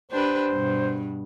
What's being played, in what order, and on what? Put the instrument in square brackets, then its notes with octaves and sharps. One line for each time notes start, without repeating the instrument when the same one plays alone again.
[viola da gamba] D4 G4 B4 [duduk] C5
[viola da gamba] G2 B2